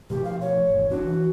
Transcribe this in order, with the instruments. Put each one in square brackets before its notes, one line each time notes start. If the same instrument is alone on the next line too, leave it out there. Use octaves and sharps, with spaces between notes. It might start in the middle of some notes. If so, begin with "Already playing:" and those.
[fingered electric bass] B2 F3 A3 [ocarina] G4
[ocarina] F5
C#5
[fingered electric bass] G#1 E2
[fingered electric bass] E1 C#4 D4 [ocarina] F#4
[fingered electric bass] E3